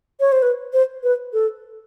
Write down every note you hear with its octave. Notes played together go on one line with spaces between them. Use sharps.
C#5
C5
B4
C5
B4
A4